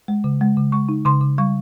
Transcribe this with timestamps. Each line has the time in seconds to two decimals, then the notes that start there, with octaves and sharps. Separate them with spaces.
0.08 G#3
0.24 C#3
0.41 G#3
0.57 C#3
0.72 G#3 C#6
0.89 D#4
1.05 C#3 C6
1.21 C#3
1.38 G3 C#6